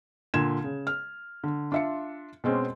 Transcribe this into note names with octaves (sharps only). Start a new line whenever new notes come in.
A#2 D3 G#6 E7
C#3
F6
D3
D4 F4 E5 C6 C#7
B2 G#3 C4 C#4